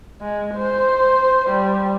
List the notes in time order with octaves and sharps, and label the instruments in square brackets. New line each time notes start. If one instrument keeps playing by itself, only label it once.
[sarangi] G#3
C5
G3